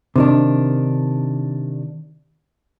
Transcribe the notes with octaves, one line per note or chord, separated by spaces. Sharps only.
C3 D#3 D4